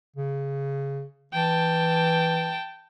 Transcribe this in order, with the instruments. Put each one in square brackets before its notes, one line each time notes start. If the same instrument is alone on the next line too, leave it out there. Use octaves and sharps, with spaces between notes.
[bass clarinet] C#3
[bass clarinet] E3 [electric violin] G5 A5